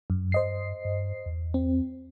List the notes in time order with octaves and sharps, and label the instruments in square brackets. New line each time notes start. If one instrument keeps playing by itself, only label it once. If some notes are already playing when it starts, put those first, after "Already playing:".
[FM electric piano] F#2
[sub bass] G2 [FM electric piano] C5 D#5 C7
[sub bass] G2
E2
[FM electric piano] C4